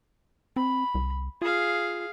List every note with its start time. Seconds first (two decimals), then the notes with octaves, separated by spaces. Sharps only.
0.56 C4 B5
0.95 C2
1.42 F4 G#4 F5